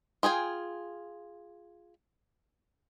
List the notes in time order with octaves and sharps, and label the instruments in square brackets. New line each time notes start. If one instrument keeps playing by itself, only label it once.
[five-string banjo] F4 G#4 G5 G#5